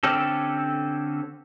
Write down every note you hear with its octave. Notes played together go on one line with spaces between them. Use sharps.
D3 C4 C#4 G4 A4